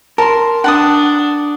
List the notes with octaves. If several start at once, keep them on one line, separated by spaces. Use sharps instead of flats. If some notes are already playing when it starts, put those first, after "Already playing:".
A#4 A5 C6
D4 F#5 A5 D#6